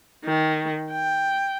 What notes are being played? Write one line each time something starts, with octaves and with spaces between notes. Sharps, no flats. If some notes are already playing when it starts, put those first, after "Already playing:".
D#3
G5